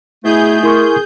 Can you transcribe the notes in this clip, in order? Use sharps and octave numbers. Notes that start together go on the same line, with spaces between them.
B2 A3 E4 G#4 G6
E4 A#4 C6 C#6